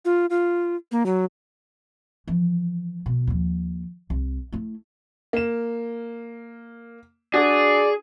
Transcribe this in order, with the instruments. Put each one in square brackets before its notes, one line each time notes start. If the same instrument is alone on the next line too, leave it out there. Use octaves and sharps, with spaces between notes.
[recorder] F4
F4
A#3
F#3
[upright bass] E3 F3
B2
D#2 F3
C2
A3 E4
[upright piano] A#3 E7
[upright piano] D4 F#4 [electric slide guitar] G#4 [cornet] D5